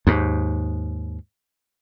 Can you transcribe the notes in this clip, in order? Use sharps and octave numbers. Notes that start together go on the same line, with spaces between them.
D#2 G#2